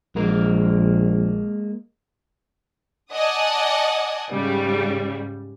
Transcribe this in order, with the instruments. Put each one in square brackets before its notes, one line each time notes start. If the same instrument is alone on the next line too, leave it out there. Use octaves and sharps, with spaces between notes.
[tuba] A#1 [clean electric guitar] G#3 A#3 A#4
[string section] D5 D#5 F#5 G#5 A5 D#6
G#2 C#3 G3